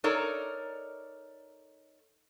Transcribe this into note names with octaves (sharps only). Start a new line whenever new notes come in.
D#4 A4 A#4 C#5 D5